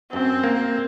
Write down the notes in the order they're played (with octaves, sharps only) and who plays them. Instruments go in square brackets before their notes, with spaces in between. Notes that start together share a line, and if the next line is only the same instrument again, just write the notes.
[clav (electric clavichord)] F#2 [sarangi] C4
[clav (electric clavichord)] A#3